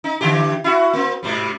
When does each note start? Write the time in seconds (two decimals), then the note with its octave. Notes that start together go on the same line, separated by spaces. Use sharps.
0.04 D#4
0.21 D3 E3 G4
0.64 E4 F#4
0.93 A#3 C4
1.23 G#2 C3 G3